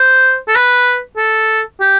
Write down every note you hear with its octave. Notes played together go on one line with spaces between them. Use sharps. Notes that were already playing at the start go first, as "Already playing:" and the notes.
Already playing: C5
A4
B4
A4
G4